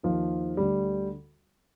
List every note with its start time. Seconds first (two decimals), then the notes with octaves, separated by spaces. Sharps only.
0.03 D#2 D#3 F3
0.57 D2 D3 G3